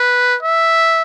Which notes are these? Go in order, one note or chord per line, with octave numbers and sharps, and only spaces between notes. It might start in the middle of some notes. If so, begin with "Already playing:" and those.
Already playing: B4
E5